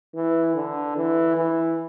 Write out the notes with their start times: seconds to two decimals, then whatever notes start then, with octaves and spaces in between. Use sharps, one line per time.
0.15 E3
0.56 D3
0.96 E3
1.36 E3